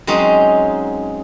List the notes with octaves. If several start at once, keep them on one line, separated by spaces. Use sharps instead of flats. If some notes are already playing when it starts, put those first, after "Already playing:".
F#3 G#3 C4 C#4 D#4